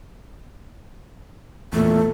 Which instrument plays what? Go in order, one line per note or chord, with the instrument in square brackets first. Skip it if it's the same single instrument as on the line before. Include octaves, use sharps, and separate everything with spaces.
[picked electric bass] E2 A#2 [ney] A3